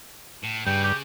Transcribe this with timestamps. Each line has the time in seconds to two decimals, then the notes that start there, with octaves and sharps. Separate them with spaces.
0.44 A2
0.66 G2 C#3 G5
0.83 G4